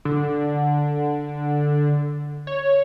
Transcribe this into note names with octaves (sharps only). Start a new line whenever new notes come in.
D3
C#5